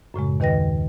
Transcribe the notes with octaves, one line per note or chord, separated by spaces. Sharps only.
F#2 A2 C#3 G#3
D#2 D#3 B4 D#5 G5 A#6